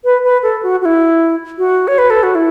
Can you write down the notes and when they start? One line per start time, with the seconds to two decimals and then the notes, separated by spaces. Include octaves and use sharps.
0.05 B4
0.24 B4
0.43 A4
0.63 F#4
0.82 F#4
0.85 E4
1.58 F#4
1.88 C#5
1.98 B4
2.10 A4
2.23 F#4
2.35 E4